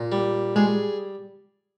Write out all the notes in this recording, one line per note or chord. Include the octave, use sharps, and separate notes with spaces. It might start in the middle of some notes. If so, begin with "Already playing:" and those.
Already playing: A#2
G3
G#3 G#4